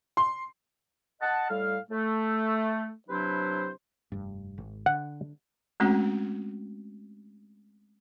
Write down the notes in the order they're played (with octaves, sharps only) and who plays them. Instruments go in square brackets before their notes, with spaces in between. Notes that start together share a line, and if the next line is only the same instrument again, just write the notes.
[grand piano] C6
[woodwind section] D#5 F#5 A5
A2 G3 A4 F5
A3
C3 F#3 D4 E4 B4 C5
[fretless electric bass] F1 G2
G#1
[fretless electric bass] D3 [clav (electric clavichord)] F#5
[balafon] G#3 A3 C4 C#4 F#4